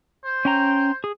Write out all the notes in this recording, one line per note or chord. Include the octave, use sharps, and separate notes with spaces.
C5
C#4 G5 A#5
G#4